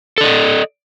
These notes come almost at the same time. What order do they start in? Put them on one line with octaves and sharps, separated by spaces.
A4 D5 D#5